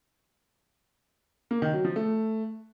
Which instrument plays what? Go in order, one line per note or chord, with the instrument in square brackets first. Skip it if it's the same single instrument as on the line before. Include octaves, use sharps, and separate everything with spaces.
[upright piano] A#3
D#3
F#3
F3
A3